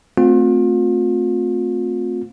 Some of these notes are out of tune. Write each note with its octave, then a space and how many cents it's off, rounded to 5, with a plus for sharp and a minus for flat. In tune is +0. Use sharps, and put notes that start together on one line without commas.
A3 +10 C4 -5 F4 +35